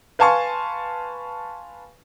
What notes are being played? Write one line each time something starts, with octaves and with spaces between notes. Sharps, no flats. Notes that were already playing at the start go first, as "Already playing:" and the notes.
B4 F5 G#5 A5 C6 C#6